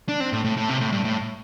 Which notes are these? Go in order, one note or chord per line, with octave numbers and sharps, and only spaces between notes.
D4
C4
A2
A2
A2
C3
A2
G2
A2